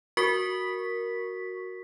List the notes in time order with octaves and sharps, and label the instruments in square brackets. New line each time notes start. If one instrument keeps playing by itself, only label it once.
[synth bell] F#4 A#4 C#6 B6